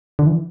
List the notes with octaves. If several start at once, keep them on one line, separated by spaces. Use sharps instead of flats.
D3
E3